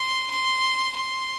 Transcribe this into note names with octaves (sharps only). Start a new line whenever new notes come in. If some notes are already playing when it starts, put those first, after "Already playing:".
Already playing: C6
C6
C6